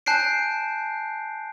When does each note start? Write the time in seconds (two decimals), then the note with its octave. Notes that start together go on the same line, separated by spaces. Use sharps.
0.06 G#5 A5 F#6 G6 C7 D7